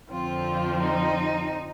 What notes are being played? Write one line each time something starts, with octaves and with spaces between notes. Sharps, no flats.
F2 D3 F3 C4 F4
D#4